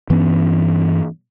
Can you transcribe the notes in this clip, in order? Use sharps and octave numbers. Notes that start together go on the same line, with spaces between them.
G2 E3 B3 C#4